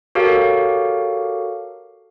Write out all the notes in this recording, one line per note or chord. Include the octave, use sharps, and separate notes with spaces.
F#4 G4 A4 A#4 C#5 F5